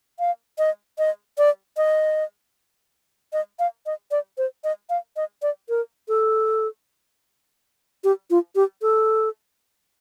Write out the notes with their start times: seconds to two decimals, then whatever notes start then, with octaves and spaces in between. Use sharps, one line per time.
0.19 F5
0.58 D#5
0.98 D#5
1.38 D5
1.77 D#5
3.33 D#5
3.59 F5
3.86 D#5
4.11 D5
4.38 C5
4.64 D#5
4.90 F5
5.16 D#5
5.42 D5
5.69 A#4
6.08 A4
8.04 G4
8.30 F4
8.55 G4
8.82 A4